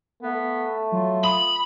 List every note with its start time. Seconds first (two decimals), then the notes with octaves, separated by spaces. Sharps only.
0.23 A3 B3
0.92 F#3 F4
1.24 B5 D#6